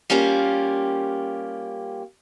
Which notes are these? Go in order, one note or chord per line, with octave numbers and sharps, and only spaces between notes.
G3 A#3 C#4 F4 G4